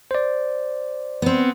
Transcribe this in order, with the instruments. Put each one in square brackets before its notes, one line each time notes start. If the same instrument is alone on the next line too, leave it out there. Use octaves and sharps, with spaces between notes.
[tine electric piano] C5 D5
[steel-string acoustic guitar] B3 C4